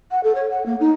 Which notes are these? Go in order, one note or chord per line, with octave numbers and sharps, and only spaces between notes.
F#5
A4
C#5
F#5
A#3
D#4